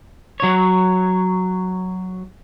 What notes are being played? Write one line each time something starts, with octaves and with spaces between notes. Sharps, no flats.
F#3 C#5